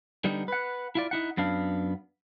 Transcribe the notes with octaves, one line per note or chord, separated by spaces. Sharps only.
D3 G3 B3 D#4
B4 F#5
E4 F4 D5
D#4 E4 F#5
F#2 B3 D4 F5